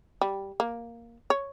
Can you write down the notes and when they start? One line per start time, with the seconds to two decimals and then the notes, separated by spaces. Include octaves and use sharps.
0.21 G3
0.60 A#3
1.30 C#5